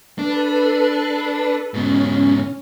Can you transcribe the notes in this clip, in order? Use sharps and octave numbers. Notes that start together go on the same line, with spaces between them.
D4 A4 B4
G#2 B2 C#4